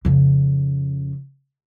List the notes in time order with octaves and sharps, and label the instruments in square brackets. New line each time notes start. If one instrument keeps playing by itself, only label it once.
[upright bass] F2 C#3